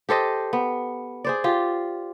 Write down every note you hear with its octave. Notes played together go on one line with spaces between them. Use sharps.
G4 A4 C5 D#5
B3
G#4 C5 D5
F4 G4